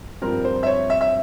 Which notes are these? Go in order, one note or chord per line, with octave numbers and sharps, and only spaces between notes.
G2 F3 C4 A#4
C5
E5
C#5
E5
E5